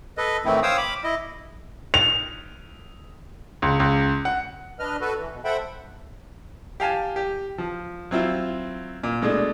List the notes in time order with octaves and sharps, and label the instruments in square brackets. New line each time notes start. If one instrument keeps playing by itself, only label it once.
[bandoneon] A4 B4 D#5
A2 D#3 E3 A3 C4 E4
C5 C#5 F5 G5 D#6 E6
B5 D6
E4 D#5
[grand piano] F7
C#2
C#2
F#5
[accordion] D4 B4 D#5 F6
F#4 A4 B4
E3
B2
A4 C5 E5 F#5 G5 B5
[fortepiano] G4 F5 G#5 A5
G4
F3
F#3 C4 E4 F4
A#2
B2 G#3 A3 D4